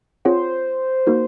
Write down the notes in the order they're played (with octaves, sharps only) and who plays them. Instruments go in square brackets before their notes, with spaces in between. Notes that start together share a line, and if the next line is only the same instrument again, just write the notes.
[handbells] C4 F4 G#4 C#5 F#5 [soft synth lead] C5
[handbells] A#3 D#4 F#4 A#4